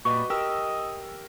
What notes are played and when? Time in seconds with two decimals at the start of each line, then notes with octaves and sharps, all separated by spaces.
0.05 A#2 G3 F#4 B4 D#5 C#6
0.30 G4 A#4 D#5 E6